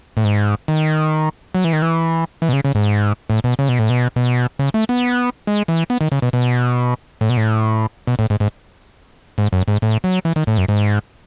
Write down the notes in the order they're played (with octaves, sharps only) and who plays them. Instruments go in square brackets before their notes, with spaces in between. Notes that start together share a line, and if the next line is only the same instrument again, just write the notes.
[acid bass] A2
G#2
D#3
F#3
E3
D#3
E3
E3
B2
C#3
C#3
G#2
A2
B2
C#3
B2
A2
B2
B2
C#3
A3
B3
G#3
E3
B3
D#3
C#3
B2
B2
A2
B2
A2
B2
A2
G#2
G#2
G#2
F#2
G#2
A2
F#3
E3
D#3
A2
F#2
G#2